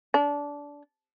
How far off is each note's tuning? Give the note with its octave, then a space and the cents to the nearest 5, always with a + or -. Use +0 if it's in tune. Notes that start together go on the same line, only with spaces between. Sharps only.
D4 -20